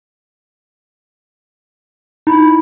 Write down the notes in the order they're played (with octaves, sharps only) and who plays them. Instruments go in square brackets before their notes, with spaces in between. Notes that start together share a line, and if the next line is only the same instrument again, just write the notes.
[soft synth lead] D#4 [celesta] E4 B5